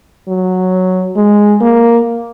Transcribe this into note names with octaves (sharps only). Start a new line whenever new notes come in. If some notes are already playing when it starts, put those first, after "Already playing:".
F#3
G#3
A#3